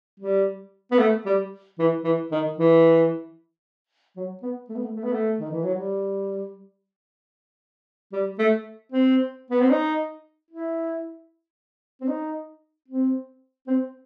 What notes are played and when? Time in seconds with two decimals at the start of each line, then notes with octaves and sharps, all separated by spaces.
0.20 G3
0.91 B3
0.99 A3
1.25 G3
1.79 E3
2.04 E3
2.31 D#3
2.58 E3
4.16 F#3
4.42 B3
4.69 A3
4.76 B3
4.83 A3
4.96 A3
5.03 B3
5.12 A3
5.40 D#3
5.51 E3
5.63 F#3
5.75 G3
8.13 G3
8.39 A3
8.92 C4
9.51 B3
9.61 C4
9.70 D#4
10.51 E4
12.01 C4
12.08 D#4
12.88 C4
13.68 C4